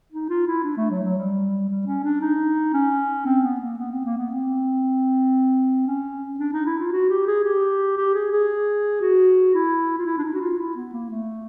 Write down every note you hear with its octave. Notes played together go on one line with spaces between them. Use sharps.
D#4
F4
E4
D4
A3
F#3
F#3
G3
G3
C#4
D4
D#4
C#4
C4
B3
A#3
B3
C4
A#3
B3
C4
C#4
D4
D#4
E4
F4
F#4
G4
G#4
G4
G4
G#4
G#4
F#4
E4
F4
E4
D4
D#4
F#4
F4
E4
B3
A#3
A3